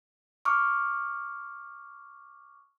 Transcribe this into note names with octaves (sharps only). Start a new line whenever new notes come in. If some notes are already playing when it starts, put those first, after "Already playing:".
C#6 D6 F6